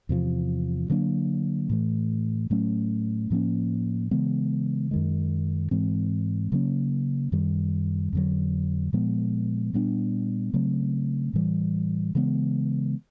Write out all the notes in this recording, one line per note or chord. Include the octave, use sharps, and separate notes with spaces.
E2 C3 F3
D3 F#3 A#3 D4
A2 E3 A3
A2 F#3 A3 C#4
A2 F3 A#3 C#4
C#3 E3 G#3 B3
F#2 D#3 G#3
G#2 E3 G#3 C4
C#3 F#3 A#3 C#4
F#2 D#3 G3
F2 D3 F#3
A#2 F3 G#3 B3
A#2 G3 B3 D4
C#3 F#3 A3 C4
A2 E3 G3
C#3 E3 G#3 B3